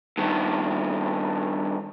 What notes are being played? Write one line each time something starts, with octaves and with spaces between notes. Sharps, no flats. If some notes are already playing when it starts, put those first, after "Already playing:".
G2 D#3